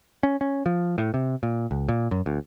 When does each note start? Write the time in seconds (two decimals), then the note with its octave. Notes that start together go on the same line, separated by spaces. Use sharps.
0.23 C#4
0.41 C#4
0.66 F3
0.98 A2
1.14 C3
1.43 A#2
1.71 C#2
1.89 A#2
2.11 F#2
2.26 D2